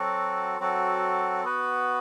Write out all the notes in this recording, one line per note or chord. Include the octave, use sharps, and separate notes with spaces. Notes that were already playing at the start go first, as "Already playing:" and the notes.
Already playing: F#3 C4 F#4 A4
F#3 C4 F#4 A4
B3 F#4 B4